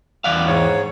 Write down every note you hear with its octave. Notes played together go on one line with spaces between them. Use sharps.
E2 D5 F5 F#5
G#2 C#5